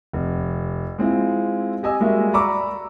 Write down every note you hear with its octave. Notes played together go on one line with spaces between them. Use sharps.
F1
G#3 C4 E4 F4
G4 D#5 G#5 E6
G3 G#3 A#3 F#4 E5 F5
D5 A#5 B5 C#6 D6 E6